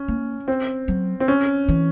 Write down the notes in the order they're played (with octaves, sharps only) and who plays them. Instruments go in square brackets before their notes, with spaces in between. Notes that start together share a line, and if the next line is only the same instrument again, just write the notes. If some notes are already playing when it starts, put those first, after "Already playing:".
Already playing: [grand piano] C#4
[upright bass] A#3
[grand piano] C4
[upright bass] F#3
[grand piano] C4
C#4
[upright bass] E3